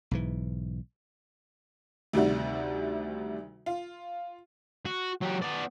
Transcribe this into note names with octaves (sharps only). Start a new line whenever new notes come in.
B1 G#2 E3
D2 C3 D#3 G3 F#4
F4
F#4
F#3 G4
B3 D5